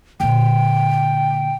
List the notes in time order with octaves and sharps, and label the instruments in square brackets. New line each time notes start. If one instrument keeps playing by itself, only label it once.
[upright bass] A#2 D3 [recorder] G5